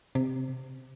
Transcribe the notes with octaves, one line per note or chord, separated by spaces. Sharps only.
C3